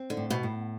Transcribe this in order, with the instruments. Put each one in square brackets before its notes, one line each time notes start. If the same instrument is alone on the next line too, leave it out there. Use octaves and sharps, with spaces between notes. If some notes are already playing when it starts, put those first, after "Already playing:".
Already playing: [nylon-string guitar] C4
[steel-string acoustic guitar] D3
[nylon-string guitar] A2
[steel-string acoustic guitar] B2
[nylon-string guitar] A2